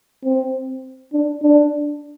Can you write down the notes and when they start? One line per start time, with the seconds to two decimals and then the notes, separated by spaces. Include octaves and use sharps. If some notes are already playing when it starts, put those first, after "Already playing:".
0.24 C4
1.13 D4
1.42 D4